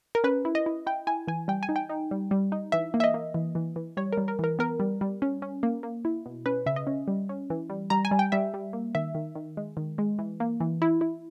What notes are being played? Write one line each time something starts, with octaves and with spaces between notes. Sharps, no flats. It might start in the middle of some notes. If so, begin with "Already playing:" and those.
A#4
C#4 B4
E4
D#5
E4
E4 G5
E4 G#5
E3 G#5
G3 G5
G#5
D#4
G5
D#4
G3
G3
D#4
E3 E5
A#3
E5
D#5
A#3
E3
E3
E3
G3 C#5
G3 A#4
A#4
E3 A#4
B3 A#4
G3
G3
C#4
C#4
A#3
A#3
E4
B2
C#4 B4
C#3 E5
D#5
C#4
G3
C#4
E3
G3
G3 A#5
G#5
G3
G5
G3 E5
G3
A#3
D#3 E5
D#3
D#3
G#3
D#3
G#3
E3
A#3
E3
E4
E4